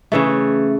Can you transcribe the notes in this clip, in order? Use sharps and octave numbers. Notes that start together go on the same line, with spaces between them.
C#3 E3 A3